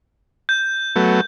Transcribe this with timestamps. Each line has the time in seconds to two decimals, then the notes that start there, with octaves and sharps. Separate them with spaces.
0.49 G6
0.96 F#3 A3 B3